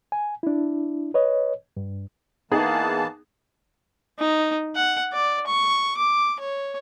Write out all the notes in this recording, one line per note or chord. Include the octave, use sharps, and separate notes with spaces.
G#5
D4 E4
B4 C#5 D#5
G2
E3 A#3 B3 D#4 G#4 A5
D#4
F#5
D5
C#6
D6
C#5